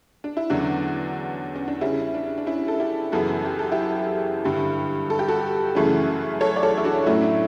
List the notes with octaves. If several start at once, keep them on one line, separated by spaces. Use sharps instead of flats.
D4
E4
E2 D3 F#3 C#4 D4 F#4
C#4
D4
C#3 G3 C#4 E4
D4
D4
C#4 E4
A4
E4 G4
F#2 C#3 E3 B3 F#4 A4
G4
A4
E4 G4
G2 D3 G3
A4
G4
F#4 A4
F#2 C#3 E3 A3 C#4
A4 C#5
D5
A4 C#5
E4
D4 F#4
A2 F#3 A3 C#4 E4
D4